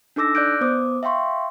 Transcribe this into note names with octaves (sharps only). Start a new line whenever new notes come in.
D4 D#4 A4 D6 E6 A#6
D5 D6 F#6 G6 D7
B3 C5 D6 D#6
E5 F5 G5 C6 C#6